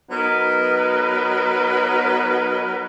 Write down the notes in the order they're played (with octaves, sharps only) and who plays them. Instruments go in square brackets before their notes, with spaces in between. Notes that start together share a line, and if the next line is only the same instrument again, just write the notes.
[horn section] F#3 B3 D#4 A#4 B4